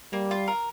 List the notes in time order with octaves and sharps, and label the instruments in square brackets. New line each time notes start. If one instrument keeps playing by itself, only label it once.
[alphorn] G3 [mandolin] A#3
[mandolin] F4
A#4